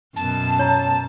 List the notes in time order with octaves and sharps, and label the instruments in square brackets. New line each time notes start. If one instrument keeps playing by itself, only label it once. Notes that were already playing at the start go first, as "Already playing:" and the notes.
[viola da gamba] F#2 B2 [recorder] A5
[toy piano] C#5 A#5